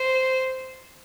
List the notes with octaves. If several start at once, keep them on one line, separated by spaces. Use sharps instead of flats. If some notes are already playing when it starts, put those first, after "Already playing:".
Already playing: C5